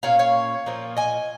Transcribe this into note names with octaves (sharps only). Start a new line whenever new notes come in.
A#2 A#3 C#4 C#5 F5
C#5 F5
A#2 F3 A#3
D#5 G#5